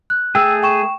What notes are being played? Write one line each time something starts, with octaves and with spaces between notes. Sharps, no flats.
F#6
A3 G#4 G5 E6
G5 C#6 E7